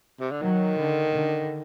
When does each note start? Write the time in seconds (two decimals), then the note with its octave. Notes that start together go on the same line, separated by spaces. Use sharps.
0.20 C3
0.31 D3
0.42 D#3 F#3
0.78 D3
1.14 D3